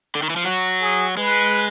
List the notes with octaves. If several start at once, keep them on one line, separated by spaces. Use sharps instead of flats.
D3
D#3
E3
F3
F#3 F#4
G#4
G#3 B4